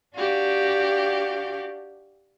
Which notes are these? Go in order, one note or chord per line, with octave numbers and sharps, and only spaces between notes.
D4 F#4 G4 F5 G5